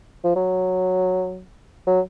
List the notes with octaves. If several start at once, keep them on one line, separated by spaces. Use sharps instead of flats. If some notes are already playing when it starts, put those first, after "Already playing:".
F3
F#3
F#3